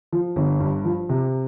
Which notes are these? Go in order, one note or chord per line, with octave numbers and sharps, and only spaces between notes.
F3
G1
G2
F3
C3